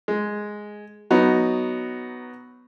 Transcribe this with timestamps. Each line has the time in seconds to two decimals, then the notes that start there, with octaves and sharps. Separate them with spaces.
0.08 G#3
1.11 F#3 B3 D#4